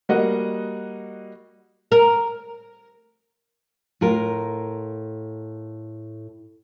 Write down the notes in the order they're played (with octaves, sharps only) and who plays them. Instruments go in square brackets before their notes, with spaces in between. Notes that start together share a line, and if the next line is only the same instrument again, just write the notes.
[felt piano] G3 A#3 F#4 D#5 F#5
[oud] A#4
[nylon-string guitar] A2 F4 A#4